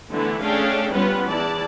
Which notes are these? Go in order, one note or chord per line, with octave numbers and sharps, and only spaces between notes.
D3 E3 A3 B3 E4
A3 C#4 D4 G#4 F5 G5
G3 B3 C#4 F4 B4
E2 E4 D5 A5